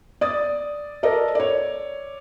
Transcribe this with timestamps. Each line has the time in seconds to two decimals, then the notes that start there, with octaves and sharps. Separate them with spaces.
0.21 D5 D#6 A6
1.03 A4 A#4 D5 D#5
1.35 C#5 D5